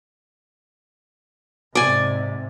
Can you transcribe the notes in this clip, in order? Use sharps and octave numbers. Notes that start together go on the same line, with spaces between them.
G#2 C3 D5 G#5